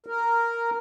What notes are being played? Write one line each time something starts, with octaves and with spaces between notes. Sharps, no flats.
A#4